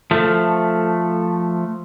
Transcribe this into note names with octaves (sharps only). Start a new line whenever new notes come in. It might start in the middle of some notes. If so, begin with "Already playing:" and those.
F3 A3